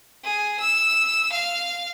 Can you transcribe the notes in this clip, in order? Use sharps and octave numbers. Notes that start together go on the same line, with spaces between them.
G#4
E6
F5